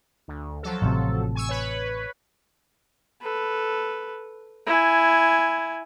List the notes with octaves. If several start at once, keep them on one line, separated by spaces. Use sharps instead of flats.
D2
F3 F#3 A4
A1 C3
G#5 C#6 E6
B4 C#5
A4 B4
E4 G#5